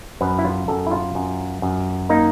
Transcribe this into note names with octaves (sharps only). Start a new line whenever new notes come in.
F#2 B4
E4
F4
F#2 A4
E4
F4
F#2
F#2
A#3 D#4